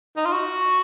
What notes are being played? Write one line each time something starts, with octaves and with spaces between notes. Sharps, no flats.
D#4
F4
F#4